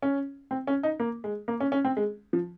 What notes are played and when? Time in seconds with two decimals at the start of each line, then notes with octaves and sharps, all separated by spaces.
0.02 C#4
0.51 C4
0.67 C#4
0.83 D#4
1.00 A#3
1.24 G#3
1.48 A#3
1.60 C#4
1.72 C#4
1.85 C4
1.97 G#3
2.33 F3